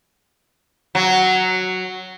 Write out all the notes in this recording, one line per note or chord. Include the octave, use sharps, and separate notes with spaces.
F#3